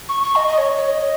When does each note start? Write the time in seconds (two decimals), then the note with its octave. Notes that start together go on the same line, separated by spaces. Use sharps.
0.09 C#6
0.23 C#6
0.36 D#5
0.48 D#5
0.58 C#5
0.77 C#5
0.88 D#5